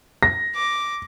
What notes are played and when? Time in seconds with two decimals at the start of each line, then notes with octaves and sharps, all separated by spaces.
0.23 A#6
0.55 D6